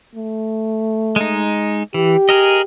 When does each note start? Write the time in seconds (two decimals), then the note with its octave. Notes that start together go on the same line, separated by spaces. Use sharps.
0.15 A3
1.16 G#3 D#4
1.94 E3 G4
2.29 G#4 A#4 D#5